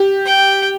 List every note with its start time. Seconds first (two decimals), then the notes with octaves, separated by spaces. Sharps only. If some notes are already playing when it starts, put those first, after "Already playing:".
Already playing: G4
0.26 G5